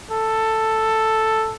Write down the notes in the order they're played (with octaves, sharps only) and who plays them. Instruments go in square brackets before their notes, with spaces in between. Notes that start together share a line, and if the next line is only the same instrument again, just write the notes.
[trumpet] A4